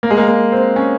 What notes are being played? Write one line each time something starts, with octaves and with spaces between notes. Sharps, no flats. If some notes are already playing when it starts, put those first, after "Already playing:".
A#3
G#3
A#3
A#3
C4
C#4